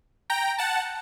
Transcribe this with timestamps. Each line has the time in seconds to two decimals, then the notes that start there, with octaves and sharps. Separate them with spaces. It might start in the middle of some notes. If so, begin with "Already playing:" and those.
0.30 G5 A#5
0.58 F#5 A5